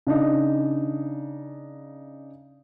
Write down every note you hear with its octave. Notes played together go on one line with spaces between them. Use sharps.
C#3 D4 D#4